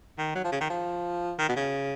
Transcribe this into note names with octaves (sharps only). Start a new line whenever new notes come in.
D#3
F#3
F3
C#3
D#3
F3
D#3
B2
C#3